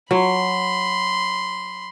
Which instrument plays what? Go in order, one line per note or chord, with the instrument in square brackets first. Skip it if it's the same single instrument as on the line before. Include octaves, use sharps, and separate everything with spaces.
[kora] F#3 [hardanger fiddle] B5 C6